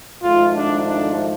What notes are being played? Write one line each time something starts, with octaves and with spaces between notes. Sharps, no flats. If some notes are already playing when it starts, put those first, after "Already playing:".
G#1 G#2 F3 A3 F4
D4
D4